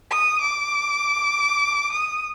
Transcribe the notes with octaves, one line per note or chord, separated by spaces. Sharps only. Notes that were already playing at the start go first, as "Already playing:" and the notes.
D#6
D6
D#6